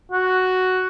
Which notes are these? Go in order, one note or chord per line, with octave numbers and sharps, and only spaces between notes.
F#4